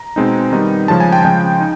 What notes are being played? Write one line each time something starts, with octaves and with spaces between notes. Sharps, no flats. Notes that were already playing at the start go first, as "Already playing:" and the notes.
Already playing: A#5
B2 G#3 C4 D#4
D#3 G3 B3 D#4
C#3 F3 G#3 C#4 A5
G#5
G5
C#3 F3 G#3 G5
D#4